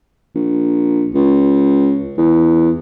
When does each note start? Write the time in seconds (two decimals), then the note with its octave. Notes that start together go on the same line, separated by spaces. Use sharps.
0.35 A#1
1.15 C#2
2.18 E2